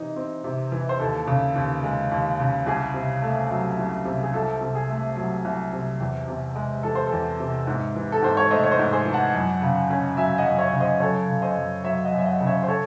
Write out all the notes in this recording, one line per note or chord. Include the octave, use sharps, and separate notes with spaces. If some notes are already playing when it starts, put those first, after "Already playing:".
Already playing: C3 E3 D#4
C4
C3
E3
C5
D#2 A4
C#3
D#2
G#3
D#2
C#3
C2 G#4
C3
A3
F#3
C2
C3
G#4
C2 A4
C3
G#4
A3
F#3
C2
C3
E2
C3
G#3
E3 A4
C5
A4
E2
C3
G#2
E3
A4
G#2 C5
C#5
A3 C5 D#5
C#5
C5 D#5
G#2
G#4 C5
E3
F#5 A5
F#2
C#3
C#4
F#3 E5 G#5
D#5 F#5
F#2
C#5 E5
C#3
C5 D#5
F#2 A4 C#5
C#3
C5 D#5
F#2
F#3 C#5 E5
D#5 F#5
F#2
E5
D#5 F#5
C#3
C#5 E5
C5
A4 C#5